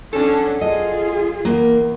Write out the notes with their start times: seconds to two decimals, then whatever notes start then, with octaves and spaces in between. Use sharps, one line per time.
0.13 F#3 C#4 D4 A4
0.61 F4 G#4 D#5
1.45 E2 A#3